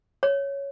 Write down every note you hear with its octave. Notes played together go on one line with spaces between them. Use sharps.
C#5